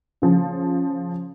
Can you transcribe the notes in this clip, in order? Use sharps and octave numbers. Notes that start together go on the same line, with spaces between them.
C#3 F3